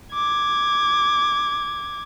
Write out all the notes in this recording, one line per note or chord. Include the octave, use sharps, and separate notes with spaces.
D6 G#6